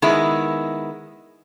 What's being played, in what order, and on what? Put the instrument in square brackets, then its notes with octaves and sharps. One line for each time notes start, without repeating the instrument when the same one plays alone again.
[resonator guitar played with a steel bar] D#3 G#3 B3 E4